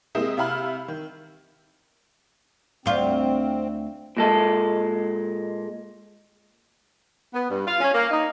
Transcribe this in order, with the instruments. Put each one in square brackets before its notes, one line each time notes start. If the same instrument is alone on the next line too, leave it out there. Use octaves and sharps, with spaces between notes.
[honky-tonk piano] G#3 A#3 C4 E4 G4 D#5
C3 E4 E5 F5 B5 F6
D#3
[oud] D2 F4 [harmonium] C4
[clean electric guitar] A#2 G#3 A4
[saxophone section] B3
G2
F4
C#4
A#3
D#4